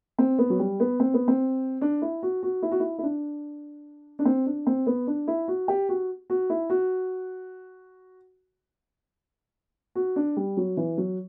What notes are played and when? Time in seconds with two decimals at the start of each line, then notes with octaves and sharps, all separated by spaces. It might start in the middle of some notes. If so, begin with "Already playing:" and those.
0.19 C4
0.39 B3
0.50 F#3
0.59 G3
0.80 B3
1.00 C4
1.14 B3
1.28 C4
1.81 D4
2.02 E4
2.23 F#4
2.43 F#4
2.62 E4
2.72 F#4
2.80 E4
2.98 E4
3.03 D4
4.19 D4
4.25 C4
4.46 D4
4.67 C4
4.87 B3
5.07 D4
5.28 E4
5.48 F#4
5.68 G4
5.89 F#4
6.30 F#4
6.50 E4
6.70 F#4
9.95 F#4
10.16 D4
10.37 G3
10.57 F#3
10.77 E3
10.98 F#3